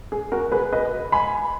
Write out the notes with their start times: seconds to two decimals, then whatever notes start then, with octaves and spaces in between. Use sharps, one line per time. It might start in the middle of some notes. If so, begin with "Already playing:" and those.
0.12 G#4
0.32 F#4 A#4
0.52 G#4 B4
0.73 B4 D#5
1.12 G#5 B5